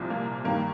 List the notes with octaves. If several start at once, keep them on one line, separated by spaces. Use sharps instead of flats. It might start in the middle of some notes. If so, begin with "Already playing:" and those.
Already playing: C2 A#2 F3
A#3
G2 D#3 A#3